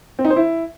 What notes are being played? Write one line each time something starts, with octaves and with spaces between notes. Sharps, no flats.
C4
D#4
C5
E4